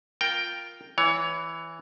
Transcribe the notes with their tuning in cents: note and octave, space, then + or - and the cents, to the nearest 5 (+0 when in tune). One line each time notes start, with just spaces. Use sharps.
F4 +0 A#4 +0 G5 +0
E3 +0 C#5 +20